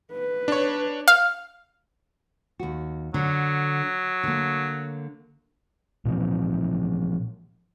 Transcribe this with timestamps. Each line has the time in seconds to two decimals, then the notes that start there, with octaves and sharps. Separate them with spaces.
0.12 B4
0.48 D4 C#5
1.08 F5
2.59 D#2 F#4
3.14 D3 F#3
4.23 D3 A#3
6.05 A#2 E3 F3 C4